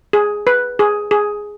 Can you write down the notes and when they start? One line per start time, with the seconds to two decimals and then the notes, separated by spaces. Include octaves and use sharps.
0.13 G#4
0.47 B4
0.79 G#4
1.11 G#4